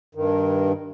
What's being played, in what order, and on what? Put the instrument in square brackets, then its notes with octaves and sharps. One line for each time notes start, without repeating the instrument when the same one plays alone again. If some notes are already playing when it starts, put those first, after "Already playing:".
[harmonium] G2 D#3